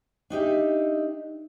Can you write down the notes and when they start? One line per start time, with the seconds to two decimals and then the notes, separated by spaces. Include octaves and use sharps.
0.30 D4 D#4 G4 E5